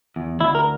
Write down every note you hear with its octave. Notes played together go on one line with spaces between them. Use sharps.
E2
D2 E4
A#4